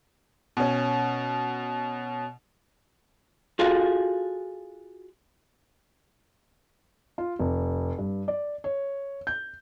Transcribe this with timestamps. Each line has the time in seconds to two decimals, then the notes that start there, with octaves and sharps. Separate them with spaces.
0.57 B2 C#4
3.59 F4 F#4 G#4 A4 F5
7.18 F4
7.39 F1
7.98 G2
8.28 D5
8.64 C#5
9.27 G6